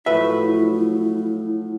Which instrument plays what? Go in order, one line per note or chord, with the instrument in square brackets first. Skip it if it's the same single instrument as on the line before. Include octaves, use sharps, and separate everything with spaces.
[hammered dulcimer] A2 F3 F#3 [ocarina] E4 [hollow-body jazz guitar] B4 E5